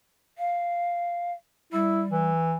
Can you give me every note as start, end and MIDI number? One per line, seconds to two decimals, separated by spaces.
0.38 1.32 77
1.73 2.30 55
1.73 2.02 64
2.11 2.57 52